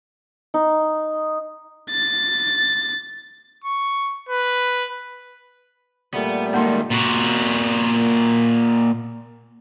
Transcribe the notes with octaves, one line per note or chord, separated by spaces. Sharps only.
D#4
A6
C#6
B4
A#2 G3 A3 B3
G#2 D#3 A#3 A5 C6
A#2 F#4